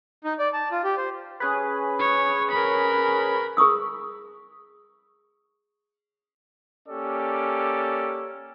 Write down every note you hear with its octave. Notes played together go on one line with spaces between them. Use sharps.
D#4
D5
A5
F4
G4
C5
C#4 G#4 B4
C#5
A#4 B5
G#4 A#5 C#6 D#6 E6
A#3 C#4 G4 A4 D5